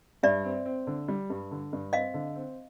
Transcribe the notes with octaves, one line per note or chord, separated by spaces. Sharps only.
G2 D5 E5
C4
C4
D3
G3
G2
D3
G2
C4 D#5 F5
D3
C4